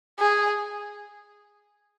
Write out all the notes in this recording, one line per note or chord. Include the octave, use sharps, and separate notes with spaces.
G#4